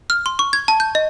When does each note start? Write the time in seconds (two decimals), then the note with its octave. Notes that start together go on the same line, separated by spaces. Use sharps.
0.10 F6
0.26 C6
0.39 C#6
0.53 G#6
0.68 A5
0.80 G6
0.95 D#5